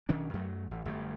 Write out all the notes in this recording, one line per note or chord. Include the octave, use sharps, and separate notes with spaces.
B1 D#3 C#4 D4
F#2 F#3 A3
A1
G1 F#2 C3 A3